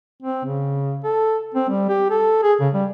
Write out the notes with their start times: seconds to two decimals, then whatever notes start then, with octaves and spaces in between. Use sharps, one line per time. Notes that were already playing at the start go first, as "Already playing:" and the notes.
0.22 C4
0.45 C#3
1.04 A4
1.54 C4
1.70 G3
1.89 G4
2.10 A4
2.43 G#4
2.60 C#3
2.74 G3